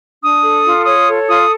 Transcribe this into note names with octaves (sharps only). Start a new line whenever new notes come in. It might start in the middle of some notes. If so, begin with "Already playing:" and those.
D4 D#6
A4
F4
C#5 D#6
A4
F4 D#6